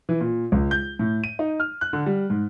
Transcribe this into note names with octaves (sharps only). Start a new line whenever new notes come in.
E3
A#2
C#2
G6
A2
D#7
D#4
F6
F#6
D3
G3
G#2